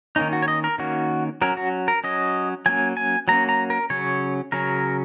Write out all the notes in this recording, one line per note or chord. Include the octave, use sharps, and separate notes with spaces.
D#3 A#3 C#4 D#4
F#4
C#5
D#5
A#4
D#3 A#3 C#4 F#4
F#3 C#4 A#4
F#4
A#4
F#3 C#4 D#5
F#3 A#3 C#4 G#5
G#5
F#3 A#3 C#4 A#5
A#5
A#4
C#3 F#3 C#4 C#5
C#3 F#3 C#4 A#4